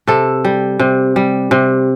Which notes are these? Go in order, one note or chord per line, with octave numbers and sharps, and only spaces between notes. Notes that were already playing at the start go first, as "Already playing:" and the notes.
C3 A4
G3
C3
G3
C3